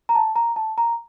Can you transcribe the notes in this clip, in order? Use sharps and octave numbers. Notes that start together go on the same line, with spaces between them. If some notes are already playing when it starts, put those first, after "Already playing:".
A#5
A5
A#5
A5
A#5